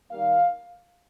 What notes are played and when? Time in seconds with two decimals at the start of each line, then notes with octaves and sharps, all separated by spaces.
0.11 D#2 D#3 G3 A#3 F5